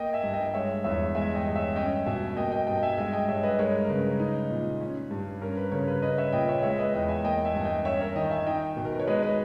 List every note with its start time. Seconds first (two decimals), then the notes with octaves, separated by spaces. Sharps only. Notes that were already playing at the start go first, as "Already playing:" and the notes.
Already playing: A#3 D#5 G5
0.13 E5 G#5
0.23 G2
0.34 D#5 G5
0.54 G#3 C#5 E5
0.84 E2 C#5 E5
1.15 G#3 E5 G#5
1.35 D#5 G5
1.46 G2
1.55 C#5 E5
1.76 C#4 D#5 G5
2.06 B2 E5 G#5
2.36 A#3 D#5 G5
2.52 D#5 G5
2.67 G2 D#5 G5
2.78 G5
2.83 E5 G#5
2.97 G#3 E5 G#5
3.13 D#5 G5
3.28 G2 C#5 E5
3.43 B4 D#5
3.59 G#3 A#4 C#5
3.85 A#4
3.89 C#3 B4
4.20 D#4
4.50 A#2
4.81 C#4
5.11 G2
5.42 C#4 A#4
5.57 B4
5.72 C#3 A#4 C#5
5.88 B4
6.02 C#4 B4 D#5
6.18 C#5 E5
6.33 A#2 D#5 G5
6.48 C#5 E5
6.63 G#3 C#5 E5
6.78 B4 D#5
6.94 E2 D#5 G5
7.09 E5 G#5
7.24 A#3 D#5 G5
7.45 E5 G#5
7.54 G2
7.65 D#5 G5
7.85 C#4 C#5 E5
8.01 A#4 C#5
8.16 D#3 D#5 G5
8.31 E5 G#5
8.46 D#4 D#5 G5
8.77 B2
8.85 A#4
8.92 B4
9.00 C#5
9.07 G#3 B4 D#5
9.22 B4 D#5